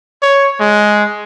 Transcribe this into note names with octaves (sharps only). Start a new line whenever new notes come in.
C#5
G#3